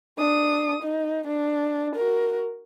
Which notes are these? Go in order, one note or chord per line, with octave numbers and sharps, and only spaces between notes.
D4 D#6
D#4
D4
F#4 A#4